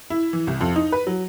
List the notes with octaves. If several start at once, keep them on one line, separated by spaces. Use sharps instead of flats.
E4
E3
C2
F2
D#4
B4
F#3